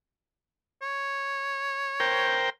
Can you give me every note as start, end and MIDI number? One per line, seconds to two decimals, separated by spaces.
0.82 2.34 73
2.00 2.50 70
2.00 2.50 72
2.00 2.50 79